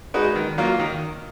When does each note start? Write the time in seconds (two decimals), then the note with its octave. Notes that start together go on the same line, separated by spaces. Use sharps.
0.14 G#3 D#4 F#4 B4
0.35 D#3
0.58 F#3 A#3 F4
0.80 D#3